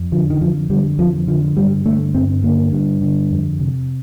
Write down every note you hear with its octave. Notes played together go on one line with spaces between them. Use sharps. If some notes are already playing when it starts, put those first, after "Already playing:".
Already playing: F2
D3 F3
D#3
F2 F3
D3 G3
F2 F3
D3 F3
G2 G3
D3 A3
G2 C4
D3 A#3
G2
D3
F2
C3